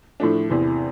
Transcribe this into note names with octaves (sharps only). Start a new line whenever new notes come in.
A2 F3 A3 D4
E2 C3 E3